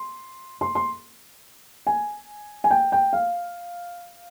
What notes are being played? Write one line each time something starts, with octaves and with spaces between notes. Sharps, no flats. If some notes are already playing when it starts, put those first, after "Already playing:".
Already playing: C6
C6
C6
G#5
G#5
G5
G5
F5